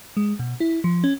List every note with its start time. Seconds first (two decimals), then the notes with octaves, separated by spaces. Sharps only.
0.17 G#3
0.39 B2
0.60 E4
0.84 F3
1.04 C#4